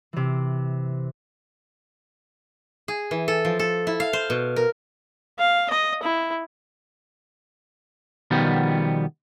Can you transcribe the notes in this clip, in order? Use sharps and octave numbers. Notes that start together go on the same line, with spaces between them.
C3 E3
G#4
E3
A4
F3
A4
E4
F5
C5
B2
A#4
F5
D#5
E4
B2 D#3 F3 G3 B3